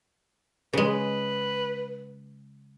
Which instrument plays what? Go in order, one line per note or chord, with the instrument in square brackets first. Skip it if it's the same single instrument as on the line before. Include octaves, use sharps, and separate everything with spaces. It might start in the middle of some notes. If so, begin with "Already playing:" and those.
[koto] C#3 G#3 [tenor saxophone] B4